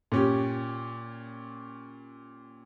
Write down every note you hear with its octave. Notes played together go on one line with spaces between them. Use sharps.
A#2 C#4 G4